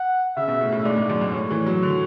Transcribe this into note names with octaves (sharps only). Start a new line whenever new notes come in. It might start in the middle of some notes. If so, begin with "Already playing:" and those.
Already playing: F#5
C#3 E5
B2
A2
A2
G#2 D5
G#2
F#2
G#2
A2 C#5
E3
F#3
D3